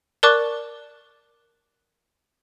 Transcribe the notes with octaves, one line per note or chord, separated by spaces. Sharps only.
A#4 D5 A5 C#6 D6 F#6